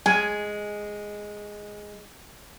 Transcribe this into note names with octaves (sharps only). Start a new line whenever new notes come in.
G#3 G#5